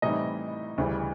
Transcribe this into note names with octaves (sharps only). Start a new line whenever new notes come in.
A2 E3 G3 C4 D#4 E4 D#5
D2 C#3 E3 G3